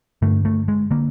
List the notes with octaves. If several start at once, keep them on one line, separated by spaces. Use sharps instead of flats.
G2 D3 A3
A3
G#3
D3 A#3